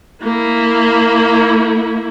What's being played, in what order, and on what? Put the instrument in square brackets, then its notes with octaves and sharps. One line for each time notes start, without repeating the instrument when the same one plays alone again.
[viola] A#3 E4